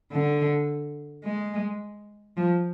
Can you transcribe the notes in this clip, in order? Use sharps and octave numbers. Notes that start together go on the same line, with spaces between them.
D3
G#3
F3